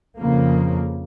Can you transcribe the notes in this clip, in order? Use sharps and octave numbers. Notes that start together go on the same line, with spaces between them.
F2 C#3 F3 A#3